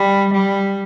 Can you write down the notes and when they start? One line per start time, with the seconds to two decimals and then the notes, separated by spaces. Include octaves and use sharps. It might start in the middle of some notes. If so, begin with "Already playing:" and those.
Already playing: G3
0.33 G3